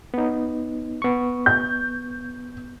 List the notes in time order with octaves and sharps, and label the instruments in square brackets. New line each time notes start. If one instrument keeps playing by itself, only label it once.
[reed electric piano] B3 D#4
B3 C#6
[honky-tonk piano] G6